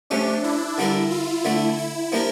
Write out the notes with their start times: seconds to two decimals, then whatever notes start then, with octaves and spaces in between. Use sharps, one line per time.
0.10 F3 A3 C#4 D4 G4
0.44 E4
0.78 D3 G3 D4 F4 A#4
1.11 F4
1.45 D3 A3 D4 E4
1.78 E4
2.12 F3 A#3 D4 G4 A#4